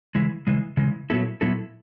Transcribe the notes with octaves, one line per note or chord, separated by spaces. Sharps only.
C#3 E3 G#3
C#3 E3 G#3
C#3 E3 G#3
A#2 F#3 B3 E4 A4
A#2 F#3 B3 E4 A4